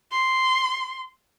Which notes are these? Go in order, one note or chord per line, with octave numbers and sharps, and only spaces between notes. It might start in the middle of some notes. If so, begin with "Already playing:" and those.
C6